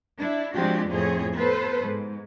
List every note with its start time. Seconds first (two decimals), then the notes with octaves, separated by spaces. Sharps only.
0.19 D4 E4
0.54 F3 G#3 C4 D4 F#4 G4
0.88 F2 A2 C4 G#4 C#5
1.35 B3 A4 B4 C5
1.79 G#2